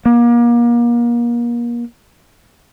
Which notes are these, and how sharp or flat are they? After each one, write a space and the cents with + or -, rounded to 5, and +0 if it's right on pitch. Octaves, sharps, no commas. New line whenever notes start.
A#3 +35